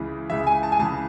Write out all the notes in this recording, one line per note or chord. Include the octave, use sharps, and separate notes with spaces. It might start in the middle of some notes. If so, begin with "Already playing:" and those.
Already playing: C#2 C#3 E3
C#2 C#3 E3 E5
G#5
A5
G#5
C#2 C#3 E3 A5